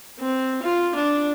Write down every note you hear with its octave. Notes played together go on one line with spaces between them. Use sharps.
C4
F4
D4